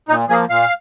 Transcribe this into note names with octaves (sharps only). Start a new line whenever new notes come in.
A#2 D#4
F3 A#3 G#4
A#2 F5